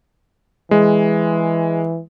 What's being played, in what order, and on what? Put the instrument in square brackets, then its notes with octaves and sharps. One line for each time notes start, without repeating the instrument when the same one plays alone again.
[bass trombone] E3 [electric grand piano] G#3